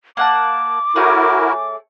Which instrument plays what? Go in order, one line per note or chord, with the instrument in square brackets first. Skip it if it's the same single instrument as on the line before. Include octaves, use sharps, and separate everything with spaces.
[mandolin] A#3 F#5 A5 [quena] D6
[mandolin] A3 G#4 C#5 [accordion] E4 F#4 A#4